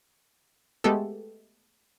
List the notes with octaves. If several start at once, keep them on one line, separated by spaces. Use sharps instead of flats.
G#3 A3 B3 G4 A4